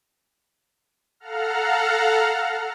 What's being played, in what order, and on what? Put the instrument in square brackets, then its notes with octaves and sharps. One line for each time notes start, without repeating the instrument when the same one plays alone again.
[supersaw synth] A4 F5 F#5 A#5 F6